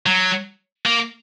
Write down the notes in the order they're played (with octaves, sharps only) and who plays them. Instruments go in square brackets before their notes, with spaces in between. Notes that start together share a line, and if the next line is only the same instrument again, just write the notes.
[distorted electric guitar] F#3
A#3